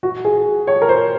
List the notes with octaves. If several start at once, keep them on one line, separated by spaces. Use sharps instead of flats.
F#4
G#4
C#5
A#4
C5